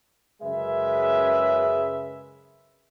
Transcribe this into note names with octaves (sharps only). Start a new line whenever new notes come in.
F#2 C#3 G#3 B4 E5